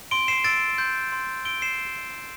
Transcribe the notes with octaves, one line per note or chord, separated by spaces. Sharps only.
C6 D7 G7
C7 E7
E6 A6 D7
C6 G6
C6
E6 D7 G7
C7 E7